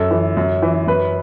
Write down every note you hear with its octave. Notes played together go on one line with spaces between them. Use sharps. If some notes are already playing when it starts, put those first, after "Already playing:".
Already playing: F#2 A4
E3
F#2
E3
F#2 B4